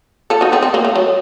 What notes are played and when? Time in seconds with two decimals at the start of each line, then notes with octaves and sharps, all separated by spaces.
0.30 F4 A4
0.41 D#4 F#4
0.52 C4 D#4
0.63 C4
0.74 A#3
0.85 A3
0.95 F#3